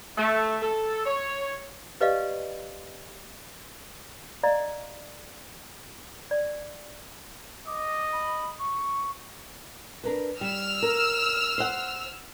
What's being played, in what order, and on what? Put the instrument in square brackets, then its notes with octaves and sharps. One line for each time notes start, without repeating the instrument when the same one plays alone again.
[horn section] A3
A4
C#5
[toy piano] G4 B4 D5 D#5 F5
D5 D#5 F5 A#5
D5
[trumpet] D#5 [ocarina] D6
[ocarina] B5
C#6
[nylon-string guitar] D4 A#4 B4
[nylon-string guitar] G3 [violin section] E6 F6
[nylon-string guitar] A#4
C5 F#5